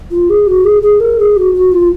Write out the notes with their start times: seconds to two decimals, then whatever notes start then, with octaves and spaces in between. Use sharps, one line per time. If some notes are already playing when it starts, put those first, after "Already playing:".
0.11 F4
0.30 G#4
0.47 F#4
0.65 G#4
0.82 G#4
1.00 A#4
1.19 G#4
1.36 F#4
1.54 F#4
1.72 F4